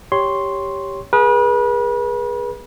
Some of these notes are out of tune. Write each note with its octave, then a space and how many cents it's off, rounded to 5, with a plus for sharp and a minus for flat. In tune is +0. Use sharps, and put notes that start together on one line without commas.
G4 +0 C#5 +0 C6 +0
G#4 +0 B4 -35